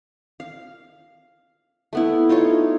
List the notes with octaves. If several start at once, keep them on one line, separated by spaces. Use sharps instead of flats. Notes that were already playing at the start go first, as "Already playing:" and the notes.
F5
A3 B3 E4
D#4 F4 A4 C#5